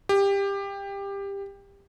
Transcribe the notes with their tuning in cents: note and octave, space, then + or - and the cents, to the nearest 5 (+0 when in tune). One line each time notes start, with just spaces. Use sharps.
G4 +20